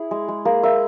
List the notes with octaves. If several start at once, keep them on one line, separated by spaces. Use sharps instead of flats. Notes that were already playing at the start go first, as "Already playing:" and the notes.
Already playing: E4 G#4
G#3
G#3
A#3 G#4
A#3 E5